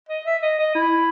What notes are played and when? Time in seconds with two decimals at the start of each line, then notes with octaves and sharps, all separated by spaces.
0.09 D#5
0.26 E5
0.42 D#5
0.59 D#5
0.75 E4